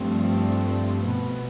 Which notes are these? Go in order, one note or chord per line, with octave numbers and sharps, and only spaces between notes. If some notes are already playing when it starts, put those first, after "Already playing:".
Already playing: G2 F3 A3 C4
B2 B3